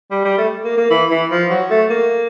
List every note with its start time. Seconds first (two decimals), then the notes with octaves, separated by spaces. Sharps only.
0.11 G3
0.25 G3
0.38 A3
0.64 A#3
0.77 A#3
0.90 E3
1.10 E3
1.31 F3
1.50 F#3
1.70 A3
1.90 A#3